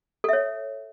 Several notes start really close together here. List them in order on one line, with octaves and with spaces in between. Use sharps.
A4 E5 C#5